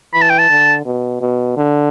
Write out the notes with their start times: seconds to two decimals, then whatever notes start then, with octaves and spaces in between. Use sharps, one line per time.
0.14 E3 B5
0.22 A5
0.30 G5
0.39 A5
0.49 D3
0.86 B2
1.21 B2
1.57 D3